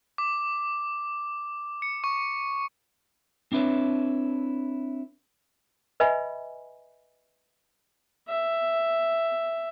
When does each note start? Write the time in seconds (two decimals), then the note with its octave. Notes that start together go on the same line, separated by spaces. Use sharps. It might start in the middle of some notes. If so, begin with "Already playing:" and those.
0.18 D6
1.82 C#7
2.04 C#6
3.52 C4 D4 E4 B4 C#5
6.00 B4 D#5 E5 G#5 B5
8.28 E5